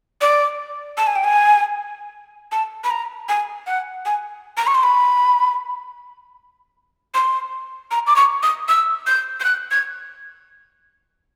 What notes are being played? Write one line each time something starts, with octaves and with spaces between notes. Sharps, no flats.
D5
A5
G#5
G5
G#5
A5
B5
A#5
G#5
F#5
G#5
A#5
C#6
C6
B5
C6
A#5
D6
C#6
D#6
E6
G6
G6
F#6
G#6